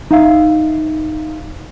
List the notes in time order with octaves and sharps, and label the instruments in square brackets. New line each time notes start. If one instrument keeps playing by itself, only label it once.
[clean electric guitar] D#4 E5 F5